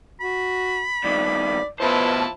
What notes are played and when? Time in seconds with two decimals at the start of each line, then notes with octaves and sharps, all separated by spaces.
0.21 F#4 B5
1.04 G2 D#3 D5
1.80 B2 F3 E4 B4 C5 A5